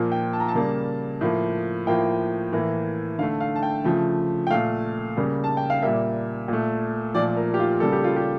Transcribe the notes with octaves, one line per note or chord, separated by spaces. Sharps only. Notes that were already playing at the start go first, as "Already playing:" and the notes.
Already playing: A#2 F3 A#3
G5
A5
A#5
A5
C#3 G3 A#3
A2 F3 A#3
A2 F3 A#3 G5
A2 E3 A#3
D3 A3 F5
F5
A5
G5
C#3 F3 A3
G5
A#2 A3 F5
C#3 G3 A#3
A5
G5
F5
A#2 G3 A#3 E5
A#2 A3
A#2 F3 A3 D5
A#4
G4
F4
C#3 G3 A#3 A4
G4
F4
G4